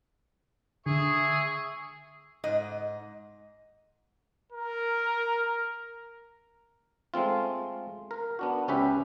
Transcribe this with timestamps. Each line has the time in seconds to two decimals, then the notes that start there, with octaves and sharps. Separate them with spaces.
0.86 D3 G#4 E5 C#6
2.44 G#2 D#5
4.52 A#4
7.14 G#3 A3 C4 F4
8.11 A#4
8.39 B3 D4 F#4
8.68 C#2 C#4 G4 B4 E5